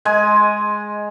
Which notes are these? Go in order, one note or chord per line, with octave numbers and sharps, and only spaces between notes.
G#3 G#5